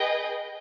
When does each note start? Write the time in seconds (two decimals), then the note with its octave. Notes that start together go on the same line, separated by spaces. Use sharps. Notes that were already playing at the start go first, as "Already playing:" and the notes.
Already playing: G#4 B4 D#5 G5